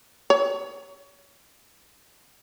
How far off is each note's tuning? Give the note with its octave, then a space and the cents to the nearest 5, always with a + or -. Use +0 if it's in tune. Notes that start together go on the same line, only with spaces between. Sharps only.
C#5 +20